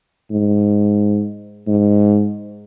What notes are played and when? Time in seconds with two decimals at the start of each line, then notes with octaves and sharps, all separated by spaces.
0.31 G#2
1.67 G#2